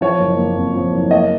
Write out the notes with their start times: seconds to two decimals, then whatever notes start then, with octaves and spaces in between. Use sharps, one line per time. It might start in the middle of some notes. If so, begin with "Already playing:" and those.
0.01 F3 C#5
0.19 F#1
0.38 A#3
0.56 F2
0.75 F3
0.92 F#1
1.11 A#3 D#5